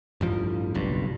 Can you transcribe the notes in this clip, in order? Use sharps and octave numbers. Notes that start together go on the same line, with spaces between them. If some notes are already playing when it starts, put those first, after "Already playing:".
A1 G2 F3
F#1 B1 G2